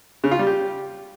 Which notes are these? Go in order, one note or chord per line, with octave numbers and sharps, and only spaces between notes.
C#3
F4
G3
G4